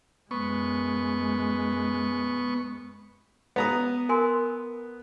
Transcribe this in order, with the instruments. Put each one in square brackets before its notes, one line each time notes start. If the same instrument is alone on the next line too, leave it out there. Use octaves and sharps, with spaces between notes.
[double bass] F#2 G#3 [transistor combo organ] B3 C#6
[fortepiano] B3 A#5 D#6
[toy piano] A#4 G#5 C6